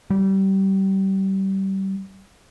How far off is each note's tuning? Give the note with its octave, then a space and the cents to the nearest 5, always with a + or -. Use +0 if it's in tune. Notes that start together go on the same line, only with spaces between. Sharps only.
G3 -25